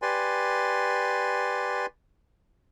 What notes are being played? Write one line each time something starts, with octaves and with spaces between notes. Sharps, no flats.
G4 B4 D5 G#5 C6